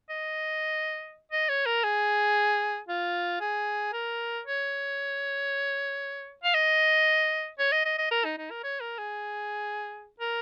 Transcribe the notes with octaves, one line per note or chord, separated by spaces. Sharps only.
D#5
D#5
C#5
A#4
G#4
F4
G#4
A#4
C#5
F5
D#5
C#5
D#5
D#5
D#5
A#4
D#4
D#4
A#4
C#5
A#4
G#4
A#4